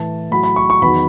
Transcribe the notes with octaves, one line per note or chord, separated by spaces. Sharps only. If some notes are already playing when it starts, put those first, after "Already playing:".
Already playing: A2 E3 A5
A2 F#3 B5
B5
C#6
C#6
E2 D#3 F#3 B5